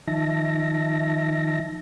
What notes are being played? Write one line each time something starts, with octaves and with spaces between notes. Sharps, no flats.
D#3 F3 D#4 E5 A5 A#6